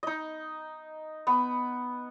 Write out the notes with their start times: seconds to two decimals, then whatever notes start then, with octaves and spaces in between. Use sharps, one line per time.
0.03 D#4 D#5
1.27 B3